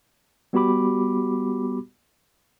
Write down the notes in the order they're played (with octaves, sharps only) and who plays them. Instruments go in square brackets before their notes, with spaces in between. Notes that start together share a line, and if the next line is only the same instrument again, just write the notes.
[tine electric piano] G3 B3 F#4 G4 B5 D6